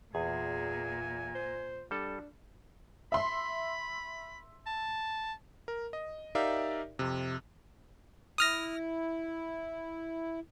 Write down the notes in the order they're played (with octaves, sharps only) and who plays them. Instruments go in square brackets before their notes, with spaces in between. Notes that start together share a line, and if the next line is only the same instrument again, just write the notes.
[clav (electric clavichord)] E2 [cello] A#2 [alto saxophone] G#4 [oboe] G#5
[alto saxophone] C5
[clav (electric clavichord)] G3 A4 [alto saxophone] D4
[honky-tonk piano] E5 C6 [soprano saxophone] B5
[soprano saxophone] A5
[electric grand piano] A#4
D#5
D#4 G4 A#4 D5 E5 F5
F2 C3
[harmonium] E4 [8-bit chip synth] D#6 F6 A#6